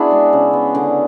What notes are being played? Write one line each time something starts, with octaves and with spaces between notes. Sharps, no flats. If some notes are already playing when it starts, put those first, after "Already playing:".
Already playing: B3 D4 E4 F#4 G#4
G#3
C#3
B3
D3